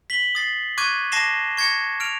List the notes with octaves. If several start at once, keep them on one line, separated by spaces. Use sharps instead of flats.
B6 F#7 G7
D#6 A6 C7
C#6 D6 F#6 G#6 D#7
A5 D6 A#6 C7 E7 G7
C#6 G#6 A#6 C#7
F6 D7 F7